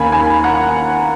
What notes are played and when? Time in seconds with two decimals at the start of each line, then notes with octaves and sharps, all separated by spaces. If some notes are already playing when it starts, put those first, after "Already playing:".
Already playing: D#2 D#3 A#3 C#4 G#5 B5
0.12 G#5 B5
0.44 F#5 A#5